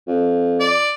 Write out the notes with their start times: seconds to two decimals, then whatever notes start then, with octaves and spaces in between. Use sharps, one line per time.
0.08 F2
0.60 D5